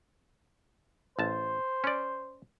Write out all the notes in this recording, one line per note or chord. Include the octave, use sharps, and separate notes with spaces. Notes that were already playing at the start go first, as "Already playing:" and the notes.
A1 C5 A5
C#4 D5